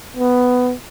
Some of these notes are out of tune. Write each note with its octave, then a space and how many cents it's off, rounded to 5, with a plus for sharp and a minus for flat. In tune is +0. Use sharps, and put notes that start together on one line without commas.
B3 +10